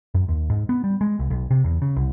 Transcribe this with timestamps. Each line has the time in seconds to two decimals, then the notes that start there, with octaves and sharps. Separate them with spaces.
0.14 F#2
0.28 D#2
0.50 G#2
0.69 B3
0.84 G3
1.01 G#3
1.19 C2
1.30 B1
1.51 C3
1.64 E2
1.82 C#3
1.96 C2